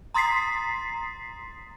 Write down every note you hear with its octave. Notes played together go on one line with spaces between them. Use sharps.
A#5 C6 D#6 A6 B6 C7